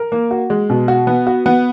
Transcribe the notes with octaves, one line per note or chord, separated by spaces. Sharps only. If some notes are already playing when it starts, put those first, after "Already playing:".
Already playing: A#4
A#3
F#4
G#3
B2
F#4
B3
F#4
B3